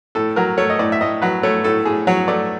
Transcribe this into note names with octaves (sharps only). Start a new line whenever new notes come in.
A2 A4
F#3 A#4
A3 C#5
D#5
A2 D5
E5
A2 D#5
F#3 B4
A3 C#5
A2 A4
A2 G#4
F#3 C#5
A3 D5